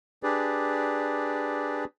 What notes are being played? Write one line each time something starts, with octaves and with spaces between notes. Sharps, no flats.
D4 G4 G#4 B4 D5